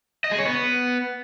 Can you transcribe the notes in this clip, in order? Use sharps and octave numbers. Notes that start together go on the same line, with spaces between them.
D#5
G#4
C#5
B3